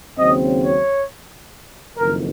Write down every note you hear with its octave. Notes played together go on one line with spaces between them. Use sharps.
D#2 C#3 F#3 C4 D#5
C#5
F#1 F2 D#3 A#4